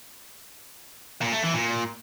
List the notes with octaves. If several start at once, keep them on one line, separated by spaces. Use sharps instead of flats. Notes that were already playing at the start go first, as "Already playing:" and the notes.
A#2
A3
E3
A#2